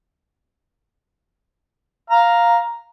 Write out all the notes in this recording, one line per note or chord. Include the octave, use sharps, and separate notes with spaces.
F5 A#5